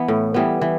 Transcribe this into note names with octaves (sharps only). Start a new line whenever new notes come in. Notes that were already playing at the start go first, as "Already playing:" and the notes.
Already playing: E3 B3
A2
E3 G3 B3
E3